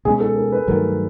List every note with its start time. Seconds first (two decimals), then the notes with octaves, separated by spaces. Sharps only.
0.05 B2 G#3 C#4 G#4
0.20 A4
0.36 A#4
0.52 B4
0.67 G2 D#3 F#3 A3 A#4